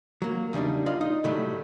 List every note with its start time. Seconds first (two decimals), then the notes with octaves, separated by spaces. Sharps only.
0.22 F#3 A#3
0.53 E2 C#3 G3 D4 D#4
0.86 F4 D5 D#5 F5
1.01 D#4 D#5
1.24 A2 C3 D#3 F#3 G3 A3